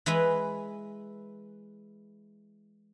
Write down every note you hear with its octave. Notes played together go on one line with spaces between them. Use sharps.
E3 G#3 E4 B4